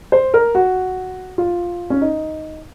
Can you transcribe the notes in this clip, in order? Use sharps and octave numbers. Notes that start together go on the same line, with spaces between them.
C5
A#4
F#4
F4
C#4
D#4